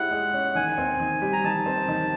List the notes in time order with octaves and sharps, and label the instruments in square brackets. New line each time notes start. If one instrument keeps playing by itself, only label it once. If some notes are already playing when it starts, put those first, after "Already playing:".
Already playing: [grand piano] G#3 C#4 E4 G4 [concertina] F#5
[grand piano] G#3
C#4
[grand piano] D#3 [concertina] G#5
[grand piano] C4
D#3
G3
[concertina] A#5
[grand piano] D#3 [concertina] A5
[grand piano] C4
D#3